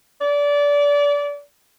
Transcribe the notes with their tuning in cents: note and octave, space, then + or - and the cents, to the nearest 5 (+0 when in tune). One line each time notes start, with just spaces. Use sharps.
D5 -25